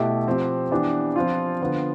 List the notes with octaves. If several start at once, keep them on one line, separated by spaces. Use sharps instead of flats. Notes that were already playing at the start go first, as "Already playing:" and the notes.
Already playing: B2 A3 E4 G4
F3 C4 G4
E3 B3 D4 G4
F3 C4 F4
D3 F3 B3 F4